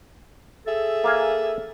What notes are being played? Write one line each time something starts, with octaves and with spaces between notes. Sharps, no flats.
G#4 A4 E5
A#3 F5 G#5